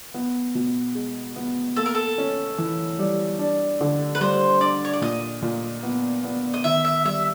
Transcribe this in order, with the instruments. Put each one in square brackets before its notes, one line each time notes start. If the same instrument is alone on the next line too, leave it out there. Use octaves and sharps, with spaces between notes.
[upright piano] B3
B2
G#3
B3
[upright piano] A#3 [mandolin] A4
[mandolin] A#4
A4
[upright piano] C#4
E3
G3
D4
D3
[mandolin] B4
[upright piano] G3 [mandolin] C5
[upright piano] D4 [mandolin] D5
[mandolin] C#5
D5
[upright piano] A#2 [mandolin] D#5
[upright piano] A#2
B3
B3
[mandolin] D#5
[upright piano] D#3 [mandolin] E5
[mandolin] E5
[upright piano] G3 [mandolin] E5